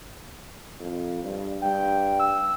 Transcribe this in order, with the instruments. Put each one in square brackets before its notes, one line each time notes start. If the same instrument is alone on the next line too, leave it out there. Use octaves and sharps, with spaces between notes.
[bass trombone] F2
G2
[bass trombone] G2 [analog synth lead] G5
[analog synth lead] E6